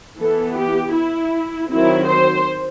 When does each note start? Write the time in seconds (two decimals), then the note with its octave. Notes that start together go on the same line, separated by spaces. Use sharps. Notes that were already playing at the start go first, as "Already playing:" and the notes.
0.19 E3 B3 A4
0.57 G4
0.95 E4
1.70 D#3 F#3 C4 E4
2.08 C5